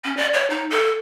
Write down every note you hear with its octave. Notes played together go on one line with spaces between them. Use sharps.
C#4
D5
C#5
D#4
A4